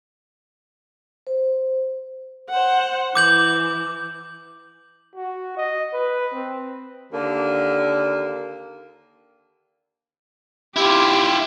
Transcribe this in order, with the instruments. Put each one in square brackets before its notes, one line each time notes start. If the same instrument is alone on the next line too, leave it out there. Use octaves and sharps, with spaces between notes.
[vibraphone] C5
[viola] C5 F#5
[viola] E3 [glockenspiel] D6 G6 F#7
[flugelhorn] F#4
D#5
B4
C4
[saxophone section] D#2 D3 A#3
[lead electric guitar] E4 F4 [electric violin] G4